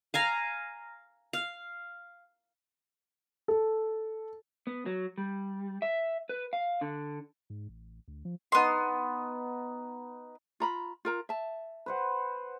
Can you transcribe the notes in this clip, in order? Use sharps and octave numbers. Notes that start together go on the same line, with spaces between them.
F5 G#5 A#5
F5
A4
B3
F#3
G3
E5
B4
F5
D3
G#2
A1
D2
F3
B3 D#4 B4 D#5 C6
F4 A#5 B5
F4 A#4 A#5
E5 A5
B4 C5 F#5